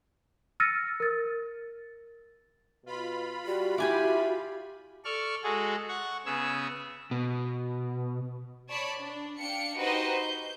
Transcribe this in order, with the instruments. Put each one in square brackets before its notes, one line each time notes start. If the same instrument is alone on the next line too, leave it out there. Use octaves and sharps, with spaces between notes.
[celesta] E6 F6 A6 A#6 C#7 D#7
A#4 A6
[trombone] B2 [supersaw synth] F4 B5
[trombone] G3 [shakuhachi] F#4
[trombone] E4 [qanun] G4 G#5 D6
[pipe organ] A4 D5 C#6 F6
G#3 F#4 G#4 A4
F#5 C#6
C#3 B3 G#4 E6
[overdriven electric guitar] B2
[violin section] C#5 D5 A5 B5
D4
D4 F5 G5 C#7
D#4 F#4 G4 B4 C5 D#5
G6